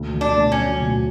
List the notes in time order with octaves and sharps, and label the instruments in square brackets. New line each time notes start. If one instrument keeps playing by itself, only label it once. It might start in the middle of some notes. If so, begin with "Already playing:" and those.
Already playing: [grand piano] D2
D3
[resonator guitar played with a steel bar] D4
[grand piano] D2
[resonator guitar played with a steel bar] C#4
[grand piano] F#3
D2